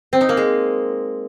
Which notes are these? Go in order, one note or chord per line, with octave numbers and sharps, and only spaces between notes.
C4
D#4
A#3
G#3